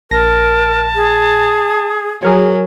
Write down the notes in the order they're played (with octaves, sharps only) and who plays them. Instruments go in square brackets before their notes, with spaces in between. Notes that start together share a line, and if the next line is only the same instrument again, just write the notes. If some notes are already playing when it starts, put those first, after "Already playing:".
[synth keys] A#1 A#6 [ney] A#4 [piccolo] A5
[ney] G#4
[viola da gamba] F#3 [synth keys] G#4 A#4 C#5